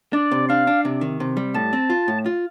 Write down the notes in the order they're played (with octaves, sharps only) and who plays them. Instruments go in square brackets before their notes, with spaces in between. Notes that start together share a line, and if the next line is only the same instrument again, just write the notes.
[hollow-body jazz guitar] D4 [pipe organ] D5
[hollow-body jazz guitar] C3
[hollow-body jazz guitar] D4 [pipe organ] F5
[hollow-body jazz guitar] D4
C3
D#3
C3
G3
[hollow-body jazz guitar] A2 [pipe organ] A5
[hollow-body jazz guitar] C4
F4
A2
F4